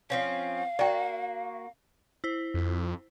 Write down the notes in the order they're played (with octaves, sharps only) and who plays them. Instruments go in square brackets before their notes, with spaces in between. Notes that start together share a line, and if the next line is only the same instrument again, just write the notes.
[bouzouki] F3 C4 C#4 [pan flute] F5
[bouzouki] A#3 F#4 [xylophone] D5 G5
[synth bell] E4 C5
[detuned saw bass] F2